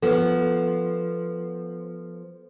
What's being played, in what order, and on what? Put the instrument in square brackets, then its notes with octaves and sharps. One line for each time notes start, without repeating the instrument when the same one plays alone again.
[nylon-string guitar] F3 B3 [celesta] A4 B4